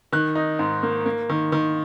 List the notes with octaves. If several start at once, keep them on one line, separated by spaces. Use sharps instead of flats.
D#3 F#6
D#4
G#2
A#3
A#3
D#3
D#3